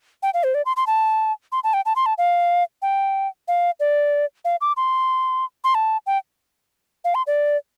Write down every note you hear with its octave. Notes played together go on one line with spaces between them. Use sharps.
G5
F5
C5
D5
C6
C6
A5
C6
A5
G5
A5
C6
A5
F5
G5
F5
D5
F5
D6
C6
C6
A5
G5
F5
C6
D5